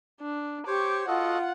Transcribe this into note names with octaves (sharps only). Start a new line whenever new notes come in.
D4
G4 C5 C#5 C#6 D6
F4 F#4 A4 D#5 F#5